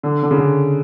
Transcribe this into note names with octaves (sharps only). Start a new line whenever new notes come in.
D3
D3
C#3
D3